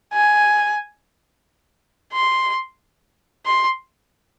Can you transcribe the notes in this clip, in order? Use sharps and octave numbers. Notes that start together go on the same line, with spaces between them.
G#5
C6
C6